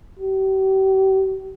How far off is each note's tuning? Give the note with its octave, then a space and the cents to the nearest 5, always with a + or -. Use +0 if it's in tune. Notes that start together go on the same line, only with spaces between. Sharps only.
G4 -40